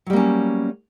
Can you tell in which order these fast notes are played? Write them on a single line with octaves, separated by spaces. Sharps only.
F#3 G3 A#3 C#4 B3